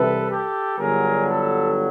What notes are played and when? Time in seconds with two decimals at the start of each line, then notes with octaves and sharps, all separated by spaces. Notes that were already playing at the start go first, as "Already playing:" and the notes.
Already playing: C2 C3 E3 A4 B4
0.30 G4 A4
0.78 G1 G2 D3 F#3 G#4 A#4
1.27 A4 B4